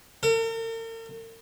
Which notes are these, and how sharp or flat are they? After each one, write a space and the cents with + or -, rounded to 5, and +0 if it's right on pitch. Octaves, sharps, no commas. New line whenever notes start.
A#4 -45